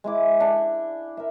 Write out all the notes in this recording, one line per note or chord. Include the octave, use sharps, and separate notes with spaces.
G#3 E4 D6
D4
A#4 E5